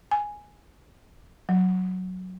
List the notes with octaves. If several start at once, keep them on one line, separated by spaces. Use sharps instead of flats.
G#5
F#3